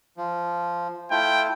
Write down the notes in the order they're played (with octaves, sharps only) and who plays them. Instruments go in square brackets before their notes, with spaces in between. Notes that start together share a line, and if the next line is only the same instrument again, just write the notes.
[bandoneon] F3
[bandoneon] A3 E4 F4 [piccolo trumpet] G5